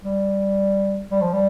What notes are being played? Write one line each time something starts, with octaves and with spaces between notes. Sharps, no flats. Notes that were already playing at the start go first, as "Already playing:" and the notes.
G3
G3
F3
G3